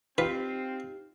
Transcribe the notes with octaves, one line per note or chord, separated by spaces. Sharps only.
C4 D#4 F4 G4 B4